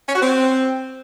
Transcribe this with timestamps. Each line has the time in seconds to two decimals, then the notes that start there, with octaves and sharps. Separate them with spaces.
0.09 C#4
0.15 F#4
0.22 C4